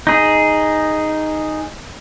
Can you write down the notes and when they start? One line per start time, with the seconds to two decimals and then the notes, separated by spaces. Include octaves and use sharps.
0.07 D#4 G#4